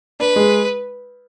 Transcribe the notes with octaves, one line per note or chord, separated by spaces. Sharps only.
D4 B4
G#3